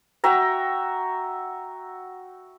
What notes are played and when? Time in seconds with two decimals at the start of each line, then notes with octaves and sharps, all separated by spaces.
0.24 F#4 E5 G5 A#5